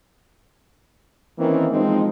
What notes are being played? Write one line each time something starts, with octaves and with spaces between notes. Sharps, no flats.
D#3 E3 A#3 C4 C#4
F3 G#3 C4 D#4